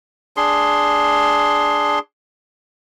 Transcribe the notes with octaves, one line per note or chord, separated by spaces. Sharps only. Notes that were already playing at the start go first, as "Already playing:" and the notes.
D4 G#4 C6